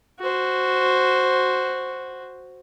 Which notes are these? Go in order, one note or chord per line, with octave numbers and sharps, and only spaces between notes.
F#4 C5